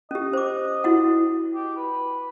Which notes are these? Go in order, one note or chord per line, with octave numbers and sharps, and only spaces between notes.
C#4 G4 D#5
C5 D6
E4 F#4 F#5
G4
B4